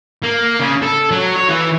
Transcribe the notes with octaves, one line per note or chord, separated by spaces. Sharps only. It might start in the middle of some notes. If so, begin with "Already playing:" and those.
A#3
C#3
A4
F#3
C#5
E3